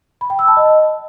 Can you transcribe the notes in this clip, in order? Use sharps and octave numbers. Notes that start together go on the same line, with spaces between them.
B5
G5
E6
A5
D#5